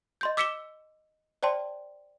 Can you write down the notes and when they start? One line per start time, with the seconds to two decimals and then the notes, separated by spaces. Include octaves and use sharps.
0.21 D#5 C6 G6
0.37 D6 E6 B6 C#7 E7 G7
1.43 C5 D5 G5 A5 C6